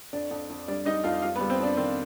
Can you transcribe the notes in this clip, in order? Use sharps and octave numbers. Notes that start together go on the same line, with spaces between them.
F2 D4 D5
F2
F2
G3 D4 D5
G3 D#4 D#5
F2 F4 F5
G3 F4 F5
B3 B4
G3
C4 C5
F2 D4 D5
D#3 C4 C5